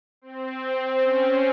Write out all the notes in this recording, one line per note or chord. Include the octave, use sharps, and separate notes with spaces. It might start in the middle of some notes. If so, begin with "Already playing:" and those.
C4
C#4